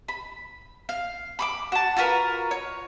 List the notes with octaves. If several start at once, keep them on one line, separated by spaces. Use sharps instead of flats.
B5
F5
B5 C#6 D6
F#4 A5
F4 F#4 A#4 B4
C#5